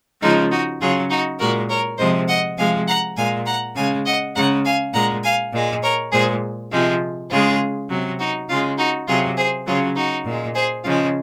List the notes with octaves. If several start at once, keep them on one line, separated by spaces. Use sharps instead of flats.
C#3 F3 G#3 D#4
D#4 F#4
C#3 F#3 F4 G#4
D#4 F#4
A#2 G#3 F#4 A#4
A#4 C#5
C3 F3 G#3 C5 D#5
D#5 F#5
C3 F3 G#3 F5 G#5
F#5 A#5
A#2 G#3 F5 G#5
F#5 A#5
C#3 G#3 F5 G#5
D#5 F#5
C#3 G#3 F#5 A#5
F5 G#5
A#2 G#3 F#5 A#5
F5 G#5
A#2 G#3
A#4 C#5
A#2 G#3 G#4 C5
C3 F3 G#3
C#3 G#3 F4 G#4
C3 F#3
D#4 F#4
C#3 G#3 F4
D#4 F#4
C3 F#3 F4 G#4
G#4 C5
C#3 F#3 F4 G#4
D#4 F#4
A#2 G#3
G#4 C5
C#3 F3 G#3 F4